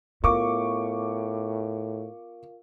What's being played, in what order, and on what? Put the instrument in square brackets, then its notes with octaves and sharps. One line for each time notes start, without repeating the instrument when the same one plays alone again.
[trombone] A2 [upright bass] B3 [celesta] F4 A#4 F5 [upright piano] C#6 D6